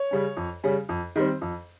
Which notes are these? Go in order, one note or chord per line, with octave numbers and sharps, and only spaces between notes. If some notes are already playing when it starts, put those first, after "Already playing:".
Already playing: C#5
C#3 G3 C#4
F2
C#3 G3 C#4
F2
D#3 G3 C4
F2